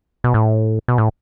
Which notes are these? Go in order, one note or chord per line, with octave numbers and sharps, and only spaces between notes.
B2
A2
B2
A2